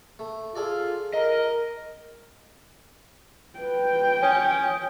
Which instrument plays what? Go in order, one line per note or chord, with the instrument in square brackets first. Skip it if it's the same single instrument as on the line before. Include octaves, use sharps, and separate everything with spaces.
[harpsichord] A3
[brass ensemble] F4 [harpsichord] G#4 A4 D5
[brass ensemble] A#4 [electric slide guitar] D#5
[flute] B4 [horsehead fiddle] G5
[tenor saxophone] C#4 [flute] D#6